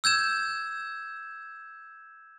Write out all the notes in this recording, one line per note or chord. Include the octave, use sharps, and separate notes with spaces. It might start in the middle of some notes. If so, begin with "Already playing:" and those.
E6 G6 G#6 E7